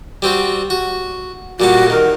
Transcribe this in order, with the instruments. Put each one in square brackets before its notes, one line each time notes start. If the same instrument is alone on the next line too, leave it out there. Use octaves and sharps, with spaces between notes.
[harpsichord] G3 C4 F#4
F#4
[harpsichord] A#2 G3 A5 [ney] F#4
[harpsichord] D#3 [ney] A#4